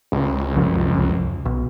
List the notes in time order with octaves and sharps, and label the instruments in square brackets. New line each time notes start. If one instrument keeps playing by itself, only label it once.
[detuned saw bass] C#2
[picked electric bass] F#1 C2 F2
B1